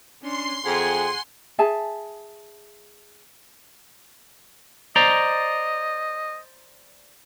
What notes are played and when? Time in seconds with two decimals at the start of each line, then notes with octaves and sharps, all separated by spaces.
0.22 C#4 D4 C6 C7
0.65 F2 G#4 F#5 G#5
1.59 G#4 E5 G#5 A5
4.96 C5 D5 D#5 A#5